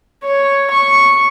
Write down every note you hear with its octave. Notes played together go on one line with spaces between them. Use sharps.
C#5
C#6